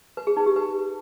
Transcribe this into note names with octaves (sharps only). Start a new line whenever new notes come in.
B4
G#4
D#4
G4
B4